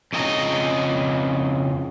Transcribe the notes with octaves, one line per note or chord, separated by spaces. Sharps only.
F2 C#3 D#5 A5 A#5